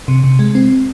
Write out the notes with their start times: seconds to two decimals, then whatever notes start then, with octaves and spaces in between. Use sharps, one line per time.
0.08 C3
0.24 C3
0.39 G#3
0.55 C4